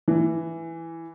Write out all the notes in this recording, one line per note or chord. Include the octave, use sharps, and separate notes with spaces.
E3